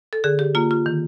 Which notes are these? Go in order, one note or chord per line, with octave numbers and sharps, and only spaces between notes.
A4
D3 G#4
G4
A#3 F4
F4
D#3